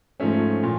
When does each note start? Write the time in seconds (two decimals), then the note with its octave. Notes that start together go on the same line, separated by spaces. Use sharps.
0.20 G#2 F3 A3 C#4 C#5
0.63 A#2